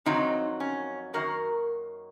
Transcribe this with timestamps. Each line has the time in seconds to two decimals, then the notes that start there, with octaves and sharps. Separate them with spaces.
0.06 F2 D#3 F#3 C4 D#4
0.60 C#4
1.14 F#2 D#3 A#3 F#4 A#4